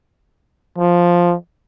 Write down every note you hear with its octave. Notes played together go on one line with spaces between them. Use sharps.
F3